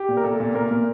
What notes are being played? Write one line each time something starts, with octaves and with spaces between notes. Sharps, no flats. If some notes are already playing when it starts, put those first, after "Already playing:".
Already playing: G4
A#2
A#4
A#2 A4
A#2
A#2 A#4
A#2